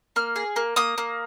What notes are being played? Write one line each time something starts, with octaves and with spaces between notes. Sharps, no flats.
A#3 F6
G#4
A#3
A#3 D#6
A#3